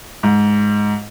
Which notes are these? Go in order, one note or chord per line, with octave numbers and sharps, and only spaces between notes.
G#2